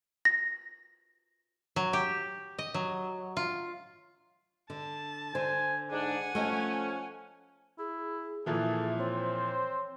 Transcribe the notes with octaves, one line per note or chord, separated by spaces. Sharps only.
A#6
F#3
G4
D#5
F#3
F4
D3 A5
D3 C5 G#5
G#2 D4 F#5 G#5
F3 A3 C#4 D#5
E4 G#4
A#2 E3 F3 G#4 A4 E5
C4 C5 C#5